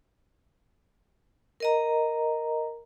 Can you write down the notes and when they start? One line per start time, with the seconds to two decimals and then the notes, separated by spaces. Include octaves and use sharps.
1.60 A#4 D#5 A#5